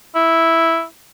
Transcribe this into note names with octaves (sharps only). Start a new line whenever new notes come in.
E4